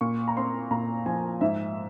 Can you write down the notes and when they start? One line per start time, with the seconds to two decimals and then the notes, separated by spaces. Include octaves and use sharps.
0.01 A#2 C#6
0.28 A#5
0.37 C4 C6
0.71 A#2 A#5
1.06 F3 G#5
1.41 G#2 E5